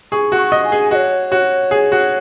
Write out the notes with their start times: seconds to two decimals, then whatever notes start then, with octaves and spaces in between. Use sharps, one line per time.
0.12 G#4 C#6
0.32 F#4
0.38 C#6
0.52 D#5
0.65 G#5
0.72 G#4
0.91 F#4 D#5
0.95 C#5
1.32 F#4
1.71 G#4
1.92 F#4